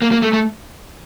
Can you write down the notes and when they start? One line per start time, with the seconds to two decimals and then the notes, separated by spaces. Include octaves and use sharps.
0.02 A#3
0.12 A#3
0.22 A3
0.33 A3